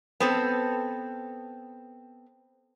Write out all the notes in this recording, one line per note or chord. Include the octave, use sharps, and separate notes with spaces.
B3 C4 A4